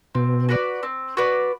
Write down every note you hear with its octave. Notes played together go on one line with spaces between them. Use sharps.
B2 C4
F#4 B4 D5
C4
F#4 B4 D5